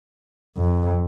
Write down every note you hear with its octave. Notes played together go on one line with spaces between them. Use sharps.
F2